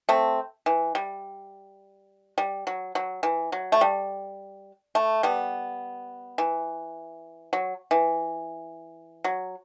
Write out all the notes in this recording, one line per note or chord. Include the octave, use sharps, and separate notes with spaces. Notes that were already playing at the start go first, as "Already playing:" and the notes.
A3 C4
E3
G3
G3
F#3
F#3
E3
F#3
A3
G3
A3
G3 B3
E3
F#3
E3
F#3